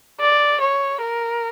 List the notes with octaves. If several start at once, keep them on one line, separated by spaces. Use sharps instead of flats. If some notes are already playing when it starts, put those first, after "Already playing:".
D5
C#5
A#4